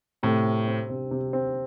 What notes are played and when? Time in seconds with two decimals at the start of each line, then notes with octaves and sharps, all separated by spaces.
0.23 A2 C3
0.45 C4
0.67 C4
0.90 C3
1.11 C3
1.33 C4